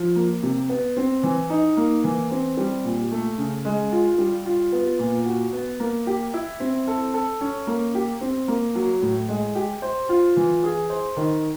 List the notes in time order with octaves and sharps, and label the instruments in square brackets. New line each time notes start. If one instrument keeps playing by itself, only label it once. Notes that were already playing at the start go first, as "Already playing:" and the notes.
Already playing: [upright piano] F3
A#3
C3
B3
C4
E3
D#4
A#3
E3
C4
G3
A#2
A3
C#3
G#3
F4
G3
F4
B3
A#2
F#4
B3
A#3
G4
E4
C4
A4
A4
C#4
A#3
G4
C4
A#3
F#3
A2
G#3
G4
C5
F4
E3
G#4
C5
D#3